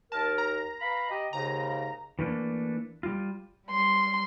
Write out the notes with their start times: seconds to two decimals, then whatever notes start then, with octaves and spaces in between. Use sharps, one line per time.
0.12 D#2 A#4 A5
0.38 A#5
0.80 B4 F5 B5
1.10 G4 D#5
1.33 D#2 G#2 C#3 A#5
2.19 E3 A3 A#3 D4
3.03 G3 F4
3.67 G3 C6